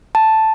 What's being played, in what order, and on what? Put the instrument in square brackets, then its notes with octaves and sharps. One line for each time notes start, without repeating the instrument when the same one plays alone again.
[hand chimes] A5